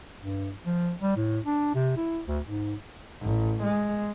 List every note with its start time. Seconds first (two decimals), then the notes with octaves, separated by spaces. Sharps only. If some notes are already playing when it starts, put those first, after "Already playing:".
0.21 G2
0.66 F3
1.02 G3
1.17 A2
1.46 D4
1.75 C3
1.97 E4
2.27 D2
2.46 G#2
3.22 A1
3.63 G#3